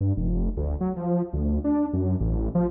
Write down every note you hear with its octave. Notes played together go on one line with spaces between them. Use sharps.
G2
F1
D2
F#3
F3
D2
D4
F#2
A1
F3